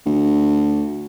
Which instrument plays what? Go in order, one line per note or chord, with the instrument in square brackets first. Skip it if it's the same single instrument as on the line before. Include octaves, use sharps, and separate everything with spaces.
[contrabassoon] D2